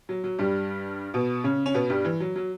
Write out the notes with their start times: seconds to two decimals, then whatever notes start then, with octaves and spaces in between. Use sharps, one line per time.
0.09 F#3
0.24 F#3
0.39 G2 G3
1.14 B2 B3
1.44 C#3 C#4
1.66 C#4
1.74 B2 B3
1.90 G2 G3
2.05 E3
2.20 F#3
2.36 F#3